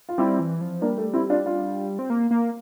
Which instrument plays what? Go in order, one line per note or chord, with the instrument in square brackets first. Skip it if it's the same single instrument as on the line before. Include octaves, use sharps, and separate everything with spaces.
[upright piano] F4
[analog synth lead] G3 [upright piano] C4 E4
[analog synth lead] E3
F3
[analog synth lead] G3 [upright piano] A#3 D4
[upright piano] A3
C4 E4
D4 F4
D4 F4
[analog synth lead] C4
A#3
A#3